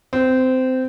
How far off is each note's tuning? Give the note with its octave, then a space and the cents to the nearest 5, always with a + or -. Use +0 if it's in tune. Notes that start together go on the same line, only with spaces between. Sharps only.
C4 -20